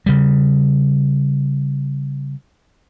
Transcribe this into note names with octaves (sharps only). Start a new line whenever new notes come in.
C#3 G3